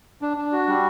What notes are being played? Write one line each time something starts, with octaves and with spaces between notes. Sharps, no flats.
D4
D4
F#4
G3